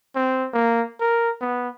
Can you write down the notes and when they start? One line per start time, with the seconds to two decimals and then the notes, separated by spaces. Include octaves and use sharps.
0.15 C4
0.53 A#3
1.01 A#4
1.41 B3